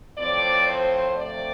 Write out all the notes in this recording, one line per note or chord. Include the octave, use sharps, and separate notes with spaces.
A2 F3 C4 D5
C5
C3 F3 A3 C4 D5